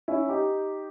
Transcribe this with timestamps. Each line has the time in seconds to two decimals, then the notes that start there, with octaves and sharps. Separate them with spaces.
0.08 C#4 E4
0.29 D#4 G4